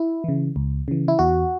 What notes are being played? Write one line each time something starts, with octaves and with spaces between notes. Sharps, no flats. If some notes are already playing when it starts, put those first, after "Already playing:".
Already playing: E4
C#3 E3
C#2
C#3 E3
E4
E2 F#4